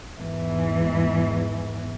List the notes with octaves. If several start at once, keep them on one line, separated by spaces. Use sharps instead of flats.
E2 G#2 E3